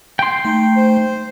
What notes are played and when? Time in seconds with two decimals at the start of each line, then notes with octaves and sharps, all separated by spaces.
0.19 G5 C6
0.45 A3 D#4
0.76 C5